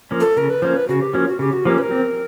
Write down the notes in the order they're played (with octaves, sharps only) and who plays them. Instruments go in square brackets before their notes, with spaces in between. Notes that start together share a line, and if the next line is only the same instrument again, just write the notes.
[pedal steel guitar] F3 A#3 C#4
[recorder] A4
[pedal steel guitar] C#3 [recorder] A#4
[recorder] B4
[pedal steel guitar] F3 A#3 C#4 [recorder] C5
[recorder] B4
[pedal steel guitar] C#3 [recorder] F#4
[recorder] G4
[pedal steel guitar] F3 A#3 C#4 [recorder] F#4
[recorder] F#4
[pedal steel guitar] C#3 [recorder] G4
[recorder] F#4
[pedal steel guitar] F3 A#3 C#4 [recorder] G4
[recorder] B4
A#4
[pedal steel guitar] C4